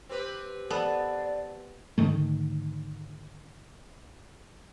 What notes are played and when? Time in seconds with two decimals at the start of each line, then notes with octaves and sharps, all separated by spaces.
0.09 C4 G4 B4
0.70 B3 A4 D5
1.98 G#2 D3 D#3 A3